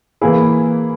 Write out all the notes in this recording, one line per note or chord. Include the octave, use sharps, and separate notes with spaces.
E3 A#3 E4 G#4